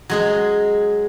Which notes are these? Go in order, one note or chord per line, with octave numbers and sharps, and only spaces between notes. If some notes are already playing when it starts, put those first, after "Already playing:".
F#3 G#3 G#4